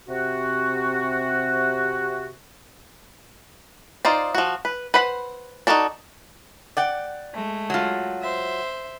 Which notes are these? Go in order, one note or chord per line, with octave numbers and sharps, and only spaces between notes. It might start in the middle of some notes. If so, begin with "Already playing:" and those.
C3 F#4
D#4 F4 C5 D5
F3 F#4
B4
B4 C5 F#5 B5
D#4 F4 F#4 A4 D5
D5 F#5 G5
G#3 A3
F#3 F4
C5 E5